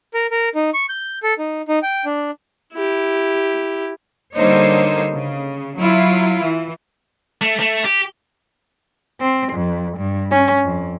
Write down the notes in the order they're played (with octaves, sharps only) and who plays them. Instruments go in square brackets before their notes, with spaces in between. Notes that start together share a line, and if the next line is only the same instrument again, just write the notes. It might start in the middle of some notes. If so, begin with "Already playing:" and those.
[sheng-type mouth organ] A#4
A#4
D#4
C#6
G6
A4
D#4
D#4
G5
D4
[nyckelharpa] E4 G4
[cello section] D3 G3 A#3 D#4 C5 C#5
C#3
F#3 E4 F4
E3
[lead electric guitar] A3
A3
G4
[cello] C4
F2
G2
C#4
F2